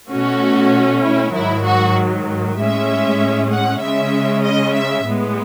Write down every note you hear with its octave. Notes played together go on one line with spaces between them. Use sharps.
B2 A3 C#4 F#4
E4
G#2 D#3 F#3 E4
F#4
A2 G#3 C#4 E5
F#5
C#3 G#3 C#4 E5
D#5
E5
A2 G#3 B3